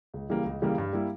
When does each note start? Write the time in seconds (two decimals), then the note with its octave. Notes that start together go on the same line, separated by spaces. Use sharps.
0.14 C#2
0.29 C#3 E3 G3 A#3
0.45 C#2
0.62 C#3 E3 G3 A#3
0.78 G2
0.93 G3 A#3 E4